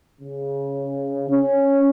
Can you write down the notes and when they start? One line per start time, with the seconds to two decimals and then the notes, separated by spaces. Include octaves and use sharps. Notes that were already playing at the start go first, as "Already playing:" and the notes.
0.21 C#3
1.29 C#4